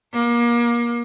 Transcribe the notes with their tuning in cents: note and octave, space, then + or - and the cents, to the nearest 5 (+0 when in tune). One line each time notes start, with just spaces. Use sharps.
A#3 +30